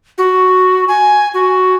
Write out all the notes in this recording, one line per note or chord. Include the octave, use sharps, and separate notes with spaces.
F#4
G#5
F#4